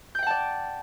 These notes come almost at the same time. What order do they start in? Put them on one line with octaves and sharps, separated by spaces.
G6 G5 F#5 A5 D5